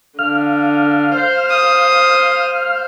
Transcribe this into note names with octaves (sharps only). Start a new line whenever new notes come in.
D3 F5 F6
C5
D#6